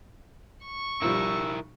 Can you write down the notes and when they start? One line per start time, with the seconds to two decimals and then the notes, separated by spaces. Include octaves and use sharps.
0.65 C#6
1.02 B1 F3 G3 E4 A#4 E6